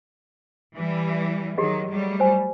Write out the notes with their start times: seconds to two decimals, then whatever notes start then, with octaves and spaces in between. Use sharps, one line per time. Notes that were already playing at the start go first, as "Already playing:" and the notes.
0.76 E3 G3
1.58 D#3 F#3 G4 G#4 D#5
1.90 F#3 G3 A3
2.20 C5 G#5